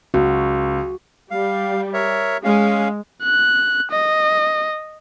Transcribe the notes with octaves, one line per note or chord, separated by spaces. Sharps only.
C#2 F#4
G3 F5
A#4 C#5 E5
G#3 C#4 F5
F#6
D#5